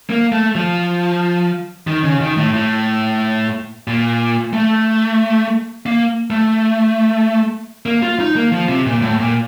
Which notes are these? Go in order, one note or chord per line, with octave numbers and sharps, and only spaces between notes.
A#3
A3
F3
D#3
C#3
D#3
A2
A2
A#2
A3
A#3
A3
A#3
F4
D#4
A#3
F3
C3
A#2
A2
A#2